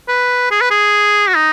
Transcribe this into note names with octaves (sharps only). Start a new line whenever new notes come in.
B4
G#4
B4
G#4
F#4
D#4